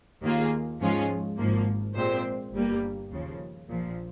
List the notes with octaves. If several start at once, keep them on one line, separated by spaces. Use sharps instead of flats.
D#2 D#3 A#3 F4 G#4
G#2 F3 G#3 C#4 F4
G#1 G#2 F3 A#3
A#2 G#3 C4 G4 C5
G1 G2 G3 A#3
D#2 C#3 F3
A#1 A#2 F3